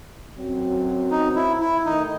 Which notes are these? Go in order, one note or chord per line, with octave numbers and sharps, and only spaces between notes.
F#2 F#3 C4
D#4
E4
E4
D#3 A3 D#4